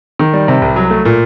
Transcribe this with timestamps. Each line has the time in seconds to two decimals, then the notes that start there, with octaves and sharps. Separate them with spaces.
0.19 D#3
0.33 G3
0.48 C3
0.62 C2
0.76 F#3
0.91 A3
1.05 A#2